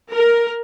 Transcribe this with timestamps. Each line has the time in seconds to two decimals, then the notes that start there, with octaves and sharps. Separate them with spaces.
0.12 A#4